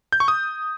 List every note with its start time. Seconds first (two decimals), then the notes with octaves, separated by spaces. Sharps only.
0.12 G6
0.20 C#6
0.28 D#6